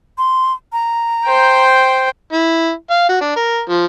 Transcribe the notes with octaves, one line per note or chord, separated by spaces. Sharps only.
C6
A#5
C5 G5
E4
F5
F#4
D4
A#4
F3